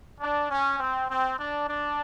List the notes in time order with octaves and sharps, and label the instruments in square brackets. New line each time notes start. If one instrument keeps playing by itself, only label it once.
[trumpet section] D4
C#4
C4
C4
D4
D4